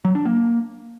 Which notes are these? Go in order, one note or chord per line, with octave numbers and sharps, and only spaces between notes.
F#3
D4
A#3